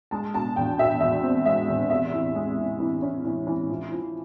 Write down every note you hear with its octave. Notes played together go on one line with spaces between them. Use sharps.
G#3 A5
B2 A5
E2 G5
B2 E5
E2 E5
C4
G#3 E5
E2
C3 E5
E3
G#3
C3
E3
C#4
E3
E3
F3
F3